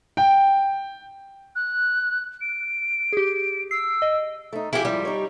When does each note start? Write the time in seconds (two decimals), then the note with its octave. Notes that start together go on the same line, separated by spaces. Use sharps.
0.17 G5
1.56 F#6
2.41 D7
3.13 G4 G#4
3.71 E6 C7
4.02 D#5
4.53 A3 D#4
4.73 F2 E4 G4 G#4 F5
4.85 G#2 F3 G3 E4
5.05 D#4 C#5